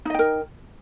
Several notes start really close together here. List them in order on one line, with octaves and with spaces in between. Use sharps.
D#4 D#5 G5 A#4